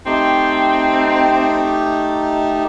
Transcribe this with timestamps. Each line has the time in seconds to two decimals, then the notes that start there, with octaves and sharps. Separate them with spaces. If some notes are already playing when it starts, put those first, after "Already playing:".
0.06 A3 C4 D#4 G4